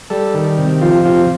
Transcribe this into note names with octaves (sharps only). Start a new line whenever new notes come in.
G3 A4
D#3
C3
F3 F4
C3 F4